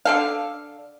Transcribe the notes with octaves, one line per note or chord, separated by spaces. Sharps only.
D3 A4 F5